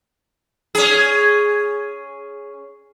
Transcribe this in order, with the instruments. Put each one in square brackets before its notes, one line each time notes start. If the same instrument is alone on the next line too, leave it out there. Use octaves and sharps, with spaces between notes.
[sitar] C#4 G#4